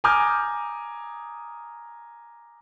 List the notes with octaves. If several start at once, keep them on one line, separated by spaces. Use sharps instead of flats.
G#5 A#5 D6 D#6 F6 G6